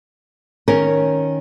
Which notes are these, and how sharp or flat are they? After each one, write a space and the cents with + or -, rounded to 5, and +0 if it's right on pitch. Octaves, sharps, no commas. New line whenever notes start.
D#3 +0 C#4 +0 A#4 +0